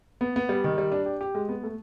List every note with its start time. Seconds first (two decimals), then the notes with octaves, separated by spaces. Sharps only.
0.21 B3
0.36 B3
0.49 G3
0.64 D#3
0.78 G3
0.92 D4
1.06 G4
1.21 G4
1.35 G#3
1.49 B3
1.63 A3